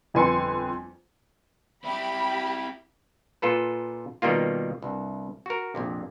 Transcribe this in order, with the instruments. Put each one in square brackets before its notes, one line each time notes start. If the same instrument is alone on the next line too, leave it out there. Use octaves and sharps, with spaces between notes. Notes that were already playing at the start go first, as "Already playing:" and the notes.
[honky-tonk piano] G1 F2 B4 G#5 C6 C#7
[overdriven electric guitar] C4 E4 [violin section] G4 B5
[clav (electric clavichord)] A#2 F4 A4 B4
B2 D#3 G3 A#3 F4
C2 G2
F#4 A#4
A#1 F2 C3